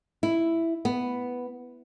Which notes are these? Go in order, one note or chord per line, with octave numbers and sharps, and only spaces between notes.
E4
B3